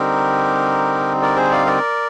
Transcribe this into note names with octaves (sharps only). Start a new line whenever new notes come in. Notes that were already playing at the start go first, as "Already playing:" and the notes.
Already playing: D3 G3 C4 D#4 G4 A#4
A#4 D5
G#4 C5
D5 F5
A#4 D5